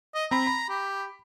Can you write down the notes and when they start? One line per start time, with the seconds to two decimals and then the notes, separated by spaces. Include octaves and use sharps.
0.14 D#5
0.31 C4 A#5 B5
0.47 B5
0.69 G4